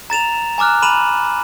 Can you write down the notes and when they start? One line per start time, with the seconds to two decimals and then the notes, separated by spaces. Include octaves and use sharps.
0.10 A#5 A6 E7 F7
0.58 G#5 A#5 D6 F6 F#6
0.82 B5 D#7 E7 F#7